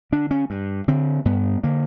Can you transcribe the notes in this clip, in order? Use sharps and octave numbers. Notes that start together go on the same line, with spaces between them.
D3 D4
C#4
G2
D3 C4
G2 B3
D3 A#3